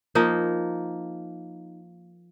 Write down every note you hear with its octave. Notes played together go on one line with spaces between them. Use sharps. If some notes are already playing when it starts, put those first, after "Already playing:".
F3 A#3 D#4